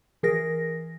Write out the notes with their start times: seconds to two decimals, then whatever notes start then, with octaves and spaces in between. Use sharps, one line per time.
0.23 E3 G#4 A#4 A#6